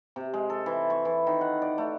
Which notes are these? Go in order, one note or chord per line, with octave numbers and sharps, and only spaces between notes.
C3
G#3
A4
E3
C#6
E3
D#3
F#5
D5
A3